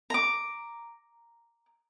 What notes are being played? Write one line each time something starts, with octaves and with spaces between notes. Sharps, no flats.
A#5 D6